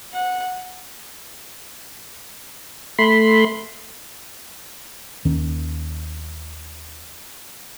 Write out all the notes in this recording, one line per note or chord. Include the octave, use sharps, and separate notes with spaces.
F#5
A3 B5 C6
D#2 D#3 C#4